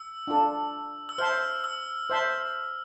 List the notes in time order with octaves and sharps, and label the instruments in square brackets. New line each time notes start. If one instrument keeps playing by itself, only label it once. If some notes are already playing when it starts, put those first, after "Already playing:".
Already playing: [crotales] E6
[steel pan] D4 F4 A4
[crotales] E6
[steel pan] C5 E5 A5 C6 [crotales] F6
[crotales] E6
[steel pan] C5 E5 A5 C6